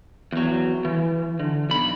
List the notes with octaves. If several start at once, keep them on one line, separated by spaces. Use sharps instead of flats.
E2 F#3
E3
D3
B1 B5